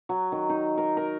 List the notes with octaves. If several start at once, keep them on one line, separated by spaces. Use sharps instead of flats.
F#3
D#3
D#4
A#4
A#4